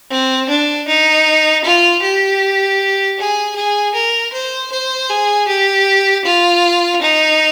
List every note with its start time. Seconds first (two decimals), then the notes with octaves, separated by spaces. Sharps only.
0.10 C4
0.49 D4
0.88 D#4
1.65 F4
2.02 G4
3.19 G#4
3.56 G#4
3.95 A#4
4.33 C5
4.72 C5
5.10 G#4
5.48 G4
6.26 F4
7.02 D#4